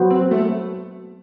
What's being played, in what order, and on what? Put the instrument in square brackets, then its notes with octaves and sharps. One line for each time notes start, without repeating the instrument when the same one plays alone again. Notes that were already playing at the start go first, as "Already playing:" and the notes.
Already playing: [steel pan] F#3 B3 F#4 C5
[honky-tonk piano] C4
A3